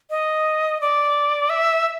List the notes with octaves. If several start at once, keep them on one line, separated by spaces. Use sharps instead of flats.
D#5
D5
E5